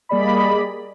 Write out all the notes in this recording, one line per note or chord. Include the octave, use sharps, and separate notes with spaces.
G3 A#3 G#4 D5 D#5 B5